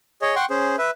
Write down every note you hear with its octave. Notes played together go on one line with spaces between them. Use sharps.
G#4 C#5 D#5
F#5 G5 C6 C#6
C#4 G#4 C5
B4 E5